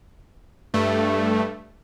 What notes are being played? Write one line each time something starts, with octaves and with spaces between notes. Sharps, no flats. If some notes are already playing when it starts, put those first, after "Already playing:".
G2 A3